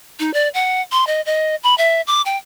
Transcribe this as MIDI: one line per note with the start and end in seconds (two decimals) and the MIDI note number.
0.20 0.33 63
0.34 0.49 74
0.54 0.81 78
0.92 1.07 84
1.07 1.21 75
1.26 1.56 75
1.63 1.77 83
1.78 2.01 76
2.07 2.22 86
2.26 2.37 79